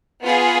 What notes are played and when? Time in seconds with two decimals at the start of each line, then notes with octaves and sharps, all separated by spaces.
0.21 B3 F4 G#4